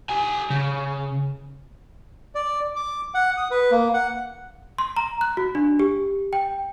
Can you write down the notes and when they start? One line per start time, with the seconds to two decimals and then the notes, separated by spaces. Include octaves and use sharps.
0.09 G4 G#5
0.50 C#3
2.35 D5
2.76 D6
3.14 F#5
3.37 D#6
3.51 B4
3.71 A#3
3.94 F#5
4.78 C6
4.97 A#5
5.21 F#6
5.37 F#4
5.55 D4
5.79 G4
6.33 G5